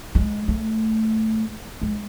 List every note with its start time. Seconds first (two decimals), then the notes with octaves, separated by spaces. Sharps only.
0.15 G#3
0.48 A3
1.82 G#3